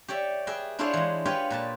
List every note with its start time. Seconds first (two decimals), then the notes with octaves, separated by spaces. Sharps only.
0.08 G4 C#5 D5 E5
0.47 G#4 B4 E5 G5
0.79 D4 E4 F4 G#4 C5 C#5
0.93 E3 G#3
1.26 F4 G4 B4 C#5 G5 G#5
1.50 A#2 B4 A5